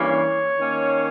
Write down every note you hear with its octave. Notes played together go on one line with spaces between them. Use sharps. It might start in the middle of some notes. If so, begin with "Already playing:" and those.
Already playing: G2 E3 A#3 C#4 C#5
D#3 A#3 C#4